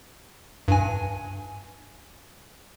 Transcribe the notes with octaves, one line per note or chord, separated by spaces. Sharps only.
G2 G#5